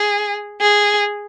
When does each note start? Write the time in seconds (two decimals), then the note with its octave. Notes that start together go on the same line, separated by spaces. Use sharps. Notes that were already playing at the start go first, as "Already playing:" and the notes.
Already playing: G#4
0.61 G#4